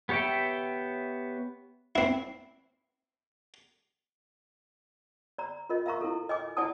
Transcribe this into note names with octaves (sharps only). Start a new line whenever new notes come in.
B3 G4 C#5 E5 G5
C4 E4
D5 A#5
F4 A#4 D#5
E5 F5 A#5 C#6
E4 A4
D#5 G#5 D6
E4 D5 F#5 G#5 A5 D#6